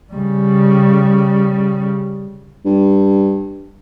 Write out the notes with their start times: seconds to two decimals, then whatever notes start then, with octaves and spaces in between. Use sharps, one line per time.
0.13 C#3 G3
2.65 G2